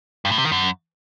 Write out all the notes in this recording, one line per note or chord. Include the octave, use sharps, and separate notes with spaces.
G2
A2
C3
D#3
F#2